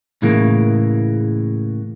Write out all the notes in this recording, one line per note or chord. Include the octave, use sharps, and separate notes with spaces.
A2 C#3 E3 G#3 A#3